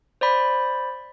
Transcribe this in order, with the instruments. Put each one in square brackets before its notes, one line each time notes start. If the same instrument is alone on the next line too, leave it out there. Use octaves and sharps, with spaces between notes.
[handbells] C5 D5 B5